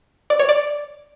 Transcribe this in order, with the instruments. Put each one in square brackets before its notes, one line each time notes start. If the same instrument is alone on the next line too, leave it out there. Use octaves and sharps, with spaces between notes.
[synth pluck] D5
C#5
D5